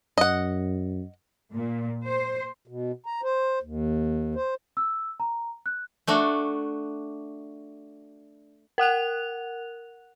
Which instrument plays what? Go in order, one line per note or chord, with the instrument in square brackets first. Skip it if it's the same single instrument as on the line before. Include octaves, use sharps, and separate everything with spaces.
[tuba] F#2 [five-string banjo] D#5 F#5
[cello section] A#2
C5
[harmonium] B2
A#5
C5
D#2
C5
[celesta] E6
A#5
F#6
[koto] A3 D4 F#4
[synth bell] A#4 F#5 F#6 F7